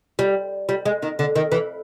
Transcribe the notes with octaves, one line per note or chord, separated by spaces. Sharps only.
G3
G3
G#3
D#3
D3
D#3
E3